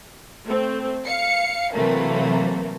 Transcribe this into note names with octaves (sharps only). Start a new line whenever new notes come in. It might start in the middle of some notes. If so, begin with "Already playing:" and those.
A3 C4
F5 C#7
C3 E3 F#3 A3 A#3